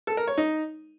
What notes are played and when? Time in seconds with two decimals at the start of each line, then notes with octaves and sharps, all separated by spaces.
0.07 A4
0.17 A#4
0.27 C#5
0.38 D#4